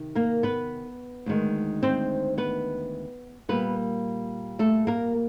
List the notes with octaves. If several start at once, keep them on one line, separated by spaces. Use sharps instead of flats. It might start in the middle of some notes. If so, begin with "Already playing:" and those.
Already playing: C3 D#3
A#3 A#4
B3 B4
D2 C3 D#3 G#3
C4 C5
B3 B4
A#2 G3 A#3 B3 B4
A3 A4
A#3 A#4